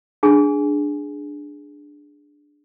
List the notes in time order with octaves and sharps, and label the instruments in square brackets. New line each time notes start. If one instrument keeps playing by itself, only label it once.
[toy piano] D4 G#4 G#5